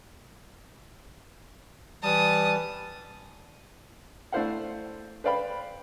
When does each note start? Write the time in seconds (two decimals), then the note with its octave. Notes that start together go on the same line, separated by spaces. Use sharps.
2.03 E3 G3 A5 D#6
4.32 A3 D4 E4 C5 F5 F#5
5.24 B4 C5 D5 F5 G5 B5